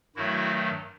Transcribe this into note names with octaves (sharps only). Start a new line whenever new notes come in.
G2 D#3 F#3 A3 E4 F#4